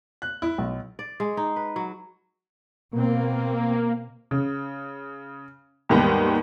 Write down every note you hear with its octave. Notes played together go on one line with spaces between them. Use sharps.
F#6
E4
B1
D5
G#3
D#4
B4
F#3
B2 A#3 C4
C#3
D#2 G#2 D#3 G3 B3